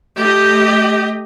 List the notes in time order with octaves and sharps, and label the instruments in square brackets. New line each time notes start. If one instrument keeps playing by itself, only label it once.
[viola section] A3 G4 D#5